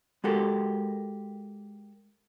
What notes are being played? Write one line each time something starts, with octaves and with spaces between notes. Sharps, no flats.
G#3 F#4 G4 A4 A#4